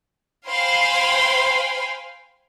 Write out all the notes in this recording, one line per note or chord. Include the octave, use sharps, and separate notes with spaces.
C5 F5 G5 G#5 B5 C6